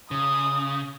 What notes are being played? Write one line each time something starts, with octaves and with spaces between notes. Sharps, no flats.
C#3 D#6